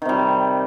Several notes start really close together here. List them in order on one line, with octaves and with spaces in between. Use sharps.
D#3 C3 G3